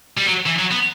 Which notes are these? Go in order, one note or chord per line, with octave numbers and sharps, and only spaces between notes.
G3
F#3
E3
F#3
B3